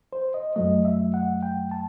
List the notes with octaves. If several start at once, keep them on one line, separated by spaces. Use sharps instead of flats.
C5
D#5
F#2 F#3 A3 D#5
E5
F#5
G5
A5